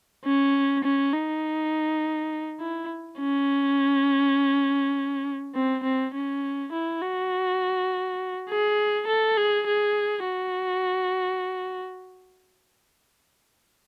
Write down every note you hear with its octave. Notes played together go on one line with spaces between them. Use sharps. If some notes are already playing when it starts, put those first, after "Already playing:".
C#4
C#4
D#4
E4
C#4
C4
C4
C#4
E4
F#4
G#4
A4
G#4
G#4
F#4